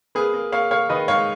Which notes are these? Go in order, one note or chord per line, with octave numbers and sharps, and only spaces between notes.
A#3 G#4 B4
A#3
A#3 C#5 F5
A#3 C#5 F5
D#3 B4 D#5
G#2 C#5 F5